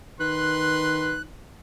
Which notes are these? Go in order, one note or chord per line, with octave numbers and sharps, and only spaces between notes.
D#3 B4 C6 F#6